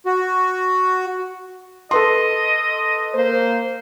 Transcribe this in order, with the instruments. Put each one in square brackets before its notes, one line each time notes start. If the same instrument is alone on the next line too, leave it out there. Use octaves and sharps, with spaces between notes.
[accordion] F#4
[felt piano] A4 B4 C6 [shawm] D#5
[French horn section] A#3 C5